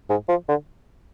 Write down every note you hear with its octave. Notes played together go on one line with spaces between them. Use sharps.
G#2
F3
D3